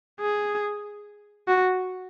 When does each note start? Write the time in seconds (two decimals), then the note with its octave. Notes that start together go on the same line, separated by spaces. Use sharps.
0.21 G#4
1.48 F#4